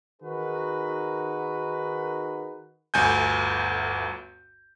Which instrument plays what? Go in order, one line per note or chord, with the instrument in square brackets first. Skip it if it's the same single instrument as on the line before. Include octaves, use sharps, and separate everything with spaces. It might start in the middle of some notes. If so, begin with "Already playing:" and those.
[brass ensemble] D#3 D#4 F#4 G#4 A#4 B4
[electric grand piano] G1 D2 G#5 G6